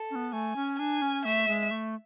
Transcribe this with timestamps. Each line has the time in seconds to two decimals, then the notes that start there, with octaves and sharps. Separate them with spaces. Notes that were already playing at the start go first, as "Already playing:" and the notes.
Already playing: A4
0.11 C#4
0.15 B3
0.33 A3 G#5
0.56 C#4
0.79 D4 G#5
1.02 C#4
1.25 A3 E5
1.48 G#3
1.71 A3